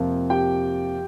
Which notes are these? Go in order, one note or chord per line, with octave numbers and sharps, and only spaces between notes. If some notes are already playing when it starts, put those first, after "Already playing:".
Already playing: F2 C3 F3 A#3
G4 G5